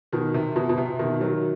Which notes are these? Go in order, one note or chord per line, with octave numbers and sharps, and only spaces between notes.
B2 D#3
C3
B2
B2
C3
B2 D#3
D#3 F#3